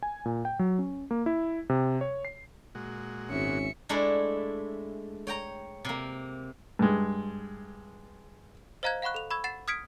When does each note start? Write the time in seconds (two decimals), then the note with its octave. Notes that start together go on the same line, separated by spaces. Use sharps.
0.03 G#5
0.25 A#2
0.45 G5
0.59 F#3
0.79 C#4
1.11 A#3
1.26 E4
1.69 C3
2.01 C#5
2.25 C7
2.75 A#2 G#3 F#4
3.30 G#1 C#4 E5 C#7
3.89 G#3 A3 D4 E4
5.27 C#5 G5 A#5
5.85 C3 A#3
6.79 G2 G#3
8.83 C5 D#5 F5 A#5 F#6 G#6
9.02 F5 F#5 B5 C#6 F#6
9.14 A4 F7
9.31 B5 C#6 E6 G#6
9.44 F#5 A6 C7 E7
9.68 D#6 F6 G#6 B6 C#7 D7